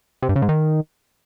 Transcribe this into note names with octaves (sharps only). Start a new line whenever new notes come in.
C3
G2
C#3
G#2
D#3